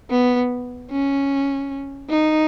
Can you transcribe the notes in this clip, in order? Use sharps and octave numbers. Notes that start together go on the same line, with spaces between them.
B3
C#4
D#4